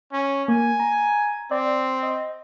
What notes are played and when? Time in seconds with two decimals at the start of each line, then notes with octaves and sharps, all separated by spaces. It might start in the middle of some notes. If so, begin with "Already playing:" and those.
0.12 C#4
0.48 A#3 G#5
0.80 A#5
1.51 C4 D5
2.03 D#5